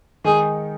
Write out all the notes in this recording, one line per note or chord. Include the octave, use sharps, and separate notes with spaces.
D#3 G#3 D#4 G#4